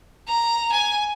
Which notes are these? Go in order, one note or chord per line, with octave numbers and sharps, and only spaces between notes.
A#5
G#5